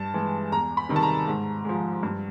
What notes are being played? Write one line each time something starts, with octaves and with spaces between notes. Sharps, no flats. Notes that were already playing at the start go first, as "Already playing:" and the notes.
Already playing: G2 A5
E3 G#3
E2 A#5
B5
C3 D#3 G3
A5
A#5
G#2
F3 G#3
G2